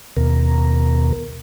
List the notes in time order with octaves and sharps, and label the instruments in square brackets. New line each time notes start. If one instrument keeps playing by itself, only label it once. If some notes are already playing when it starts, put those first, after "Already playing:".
[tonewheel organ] D#2 B2 A#4